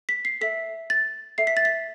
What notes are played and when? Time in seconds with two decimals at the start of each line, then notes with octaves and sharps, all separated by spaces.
0.09 B6
0.25 C7
0.41 A4 E5 B6
0.90 A6
1.38 A4 E5 C7
1.47 B6
1.57 A6
1.65 B6